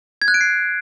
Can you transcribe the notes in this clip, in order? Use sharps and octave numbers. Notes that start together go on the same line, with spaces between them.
G#6
F#6
D7
C7